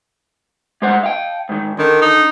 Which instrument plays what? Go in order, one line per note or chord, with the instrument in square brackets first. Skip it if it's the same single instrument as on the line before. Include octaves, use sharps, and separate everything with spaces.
[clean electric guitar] G#3 C5 F#5
F5 G5
G#2 D#3
[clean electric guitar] D3 [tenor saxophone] D#3
[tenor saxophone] D#4